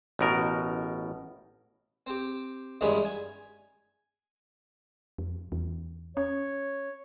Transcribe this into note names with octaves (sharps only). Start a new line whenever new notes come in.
A1 B2 A#4
C4 G4
E2 G2 D#3 G3 G#3 C#4
G#5
F2
E2
C#4 C#5